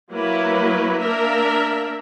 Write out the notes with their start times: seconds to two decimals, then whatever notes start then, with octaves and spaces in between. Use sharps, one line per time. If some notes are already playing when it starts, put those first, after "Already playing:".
0.11 F#3 A#3 E4 B4
1.01 A#3 D4 A#4 E5